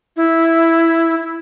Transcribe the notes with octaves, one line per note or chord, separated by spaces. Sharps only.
E4